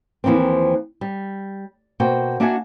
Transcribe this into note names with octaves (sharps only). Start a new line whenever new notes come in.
D#2 E3 F3 A#3 C4
G3
B2 A#3 F#4 C5 G5
A#3 D4 F#4 E5 F#5 G#5